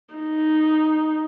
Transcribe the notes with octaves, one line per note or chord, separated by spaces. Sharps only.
D#4